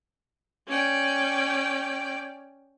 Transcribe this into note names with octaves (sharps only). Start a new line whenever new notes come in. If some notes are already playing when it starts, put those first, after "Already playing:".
C#4 D5 G5